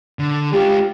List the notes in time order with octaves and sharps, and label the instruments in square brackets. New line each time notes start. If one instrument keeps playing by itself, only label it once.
[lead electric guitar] D3
[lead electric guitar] G#3 F4 [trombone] G4